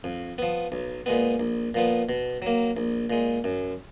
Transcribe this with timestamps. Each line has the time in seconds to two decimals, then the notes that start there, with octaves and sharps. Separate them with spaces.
0.04 F2
0.38 F3 B3
0.72 B1
1.06 A#2 G#3 B3
1.40 A#1
1.74 A#2 F3 B3
2.09 B2
2.42 F#3 A#3
2.77 A#1
3.10 A#2 G#3
3.44 F#2